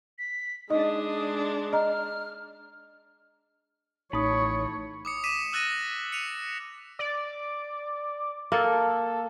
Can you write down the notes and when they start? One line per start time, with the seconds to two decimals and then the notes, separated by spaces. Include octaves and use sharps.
0.19 B6
0.70 G#3 D4 D#4 D#5 D#6
1.73 D#5 A#5 F6
4.13 A1 A3 D#4 C#5 B5 D#6
5.05 D6 D#6 C#7
5.24 D6 B6 D#7 E7
5.52 D#6 E6 F#6 A6 A#6 D#7
6.12 C#7 D#7 F7
6.99 D5
8.52 A#3 A4